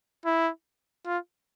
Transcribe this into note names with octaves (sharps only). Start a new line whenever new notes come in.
E4
F4